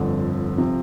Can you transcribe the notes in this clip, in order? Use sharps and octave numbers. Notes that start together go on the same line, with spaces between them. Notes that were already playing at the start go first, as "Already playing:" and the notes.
Already playing: G1 F2 D3
C3 F3